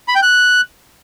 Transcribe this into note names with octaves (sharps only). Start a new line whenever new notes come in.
B5
G5
F#6